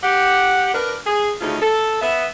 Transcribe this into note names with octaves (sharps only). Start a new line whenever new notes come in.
G4 F#5
D4 A#4 B4
G#4
D2 C#3 G#3 A3 D#4 F4
A4
B3 E5